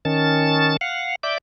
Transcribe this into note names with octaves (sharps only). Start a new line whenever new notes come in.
D#3 C#4 A5 A6
F5 F#5
D5 E5 D6 G6